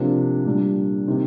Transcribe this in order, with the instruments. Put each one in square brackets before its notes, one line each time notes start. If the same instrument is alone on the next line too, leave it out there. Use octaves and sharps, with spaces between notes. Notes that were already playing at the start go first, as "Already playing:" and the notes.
Already playing: [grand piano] C3 F3 A#3 D4
A#2 G3 D4
C3 D#3